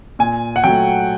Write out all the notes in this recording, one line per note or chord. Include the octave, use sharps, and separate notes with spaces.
A#2 G#5
F#5
F#3 A3 G5